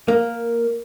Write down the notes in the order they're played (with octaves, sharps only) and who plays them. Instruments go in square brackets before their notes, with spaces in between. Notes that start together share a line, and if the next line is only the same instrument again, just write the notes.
[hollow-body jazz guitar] A#3 [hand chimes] A#4